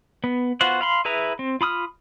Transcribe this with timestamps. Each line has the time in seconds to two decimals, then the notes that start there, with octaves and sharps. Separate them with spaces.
0.24 B3
0.61 B3 F4 F#4 C5 F#5
0.81 F5 B5 C6
1.05 E4 G#4 B4 E5 A#5
1.39 C4
1.61 F4 B5 D#6 F6